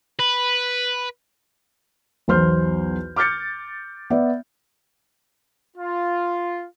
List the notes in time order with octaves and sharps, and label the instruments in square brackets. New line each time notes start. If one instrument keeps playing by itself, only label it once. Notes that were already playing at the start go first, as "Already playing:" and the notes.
[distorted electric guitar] B4
[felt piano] B1 E2 C5 C6 F6 G6
D6 F6 G6 A6 C#7
B3 D5 E5
[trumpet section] F4